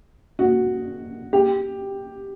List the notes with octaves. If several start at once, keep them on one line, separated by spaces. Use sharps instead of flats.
F#4
G4